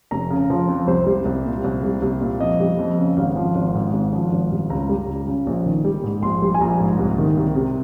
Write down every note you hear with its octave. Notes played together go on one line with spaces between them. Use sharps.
F1 A#5
C#3
F3
F2
C2 C5
G3
C2
A#2
C2
G3
C2
A#2
F2 D#5
G3
F2
C#3
G#1 F5
F3
G#1
G#2
G#1
F3
G#1
G2
C#2 A#5
G3
C#2
C#3
A#1
D#3
G3
G#2
A#1 C6
G3
G#5
A#1 A#5
G#2
C2
D#3
C2
C3